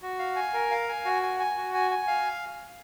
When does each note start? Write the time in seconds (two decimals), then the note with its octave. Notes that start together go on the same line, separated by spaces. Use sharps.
0.02 F#4
0.19 F5
0.36 G#5
0.54 A#4
0.71 F5
0.89 G#5
1.05 F#4
1.22 G#5
1.40 G#5
1.57 F#4
1.74 G#5
1.91 G#5
2.07 F5